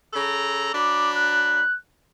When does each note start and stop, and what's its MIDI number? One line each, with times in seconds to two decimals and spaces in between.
0.14 0.74 49
0.14 0.74 69
0.14 0.74 82
0.75 1.63 54
0.75 1.63 62
0.75 1.63 83
0.75 1.10 86
1.16 1.77 90